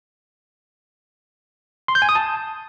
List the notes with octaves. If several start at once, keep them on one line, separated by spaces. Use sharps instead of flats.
C6
G6
G#5
D#6
A5